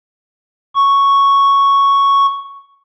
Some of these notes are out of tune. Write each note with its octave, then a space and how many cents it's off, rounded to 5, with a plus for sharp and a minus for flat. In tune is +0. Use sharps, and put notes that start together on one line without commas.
C#6 +0